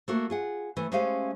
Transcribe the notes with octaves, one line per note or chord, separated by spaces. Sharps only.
A3 A#3 F#4
F4 G#4 F#5
E3 A3
G#3 A3 C#4 G4 C5 F5